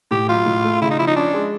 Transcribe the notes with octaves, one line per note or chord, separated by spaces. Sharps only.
A2 G4
F#3 F4
A2
A3
C#3 E4
D#4
F3 E4
D#4
C#4 D4
G#3